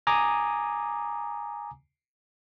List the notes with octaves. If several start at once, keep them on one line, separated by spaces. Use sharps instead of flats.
G#5 A#5 D6 D#6